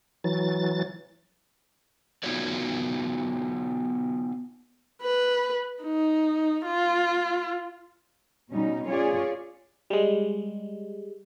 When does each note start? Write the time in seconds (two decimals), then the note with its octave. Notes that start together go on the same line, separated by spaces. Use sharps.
0.24 E3 F#3 A6
2.23 B3 D#4 F4 F#4 C#5 D5
5.02 B4
5.83 D#4
6.65 F4
8.50 B2 G3 C#4 D#4
8.86 C#4 F4 G#4 C#5 D5
9.90 G3 G#3